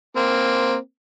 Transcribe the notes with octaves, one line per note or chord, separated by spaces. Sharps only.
A#3 C4